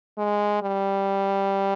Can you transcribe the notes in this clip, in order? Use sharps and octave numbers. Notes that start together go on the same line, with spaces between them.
G#3
G3